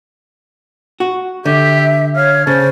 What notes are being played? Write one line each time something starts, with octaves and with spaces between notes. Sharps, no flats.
F#4
D3 G4 E5
C#5 F5
C#3 C5 A5